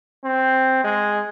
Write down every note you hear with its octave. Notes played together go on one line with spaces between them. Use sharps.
C4
G#3